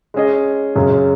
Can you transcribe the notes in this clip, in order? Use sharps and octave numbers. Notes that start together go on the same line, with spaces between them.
G#3 C#4 G#4 D#5
F#2 C#3 G#3 C#4